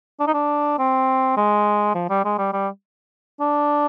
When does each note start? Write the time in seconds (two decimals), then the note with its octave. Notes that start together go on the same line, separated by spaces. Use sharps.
0.20 D4
0.27 D#4
0.34 D4
0.79 C4
1.37 G#3
1.95 F3
2.10 G3
2.24 G#3
2.38 G3
2.53 G3
3.40 D4